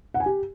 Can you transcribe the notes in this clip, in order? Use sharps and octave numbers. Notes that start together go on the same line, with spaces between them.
F#5
G#5
G4